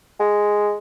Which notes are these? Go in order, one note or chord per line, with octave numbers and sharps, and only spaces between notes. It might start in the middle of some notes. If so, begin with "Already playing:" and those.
G#3